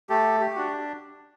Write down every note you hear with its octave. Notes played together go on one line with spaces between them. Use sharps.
A3 G4 A4
G4
D4 F#4